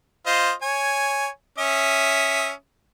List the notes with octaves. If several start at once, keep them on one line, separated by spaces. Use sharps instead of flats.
F4 C5 D#5
C#5 G#5
C#4 E5 D#6